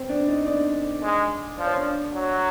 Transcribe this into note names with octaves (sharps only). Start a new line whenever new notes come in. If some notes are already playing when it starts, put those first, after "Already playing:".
Already playing: C4 C5
D4 D5
D5
D#4 D#5
D4 D5
G#3
F3 D5
C#5
D4 D5
F#3